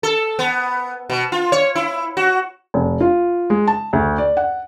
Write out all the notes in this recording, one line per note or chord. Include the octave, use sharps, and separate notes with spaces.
A4
B3
B2
F4
C#5
E4
F#4
F1
F4
G#3
A5
D2
D5
F#5